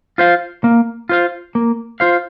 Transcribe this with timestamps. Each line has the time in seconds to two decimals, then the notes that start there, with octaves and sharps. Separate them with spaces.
0.18 F4 C5 F5
0.64 A#3
1.09 F4 C5 F5
1.55 A#3
2.00 F4 C5 F5